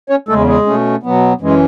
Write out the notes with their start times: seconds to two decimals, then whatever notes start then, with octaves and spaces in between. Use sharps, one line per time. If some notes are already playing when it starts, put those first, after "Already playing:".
0.10 C#4 C#5
0.29 E2 C#3 G#3 A3 A4
0.47 G#3 G#4
0.66 B2 A3 C#4
1.03 B2 F#3 B3
1.41 F#2 E3 G#3 C#4